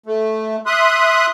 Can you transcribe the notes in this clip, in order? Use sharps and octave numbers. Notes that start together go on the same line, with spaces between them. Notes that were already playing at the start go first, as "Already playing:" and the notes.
A3
E5 C6 D#6 F#6